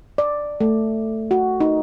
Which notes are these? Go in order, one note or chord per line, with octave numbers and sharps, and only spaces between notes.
D5
A3
F#4
D#4